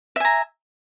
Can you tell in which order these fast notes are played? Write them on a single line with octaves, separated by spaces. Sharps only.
E5 G#5 A#5